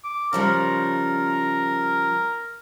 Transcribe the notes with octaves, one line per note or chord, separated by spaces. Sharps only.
D6
C#3 F3 G3 A#4